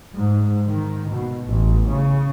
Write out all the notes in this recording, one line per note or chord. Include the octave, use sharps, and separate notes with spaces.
G#2
D#3
B2
A1
C#3